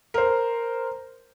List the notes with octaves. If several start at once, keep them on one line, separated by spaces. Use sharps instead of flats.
A#4 C5